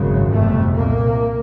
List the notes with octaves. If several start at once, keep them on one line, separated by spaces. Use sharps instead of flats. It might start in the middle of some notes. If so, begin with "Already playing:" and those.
Already playing: G#1 F#2 C#3
G1 F2 C3 A3
C2 A#2 A#3